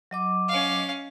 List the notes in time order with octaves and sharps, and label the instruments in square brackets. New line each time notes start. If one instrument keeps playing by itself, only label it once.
[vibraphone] F#3 D#5 D6
[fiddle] C#4 F5